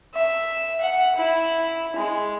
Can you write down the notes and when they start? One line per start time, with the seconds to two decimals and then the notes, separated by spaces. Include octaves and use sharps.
0.14 E5
0.81 F#5
1.16 E4
1.96 G#3